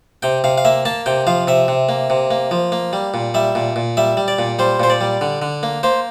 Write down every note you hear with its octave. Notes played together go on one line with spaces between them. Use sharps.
C3 G5
C3 F5
F5
A#3 E5
A#3 A5
C3 G5
F3 F5
C3 E5
C3
A#3
C3
A#3
F3
A#3
G3
A#2
G3 E5
A#2
A#2
G3 E5
G3
D5
A#2
G3 C5
A#2 C5
D5
G3
D3
D3
A#3
A#3 C5